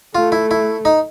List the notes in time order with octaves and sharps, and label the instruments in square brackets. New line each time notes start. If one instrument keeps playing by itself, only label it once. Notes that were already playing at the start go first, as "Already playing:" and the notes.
[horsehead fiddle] A3 [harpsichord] F4
[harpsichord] E4
E4
D#4